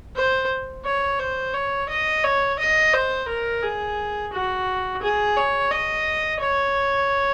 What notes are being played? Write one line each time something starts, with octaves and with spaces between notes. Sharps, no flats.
C5
C#5
C5
C#5
D#5
C#5
D#5
C5
A#4
G#4
F#4
G#4
C#5
D#5
C#5